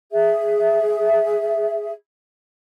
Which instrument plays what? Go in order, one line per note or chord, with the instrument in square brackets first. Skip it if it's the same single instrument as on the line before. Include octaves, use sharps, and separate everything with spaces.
[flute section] G#4 E5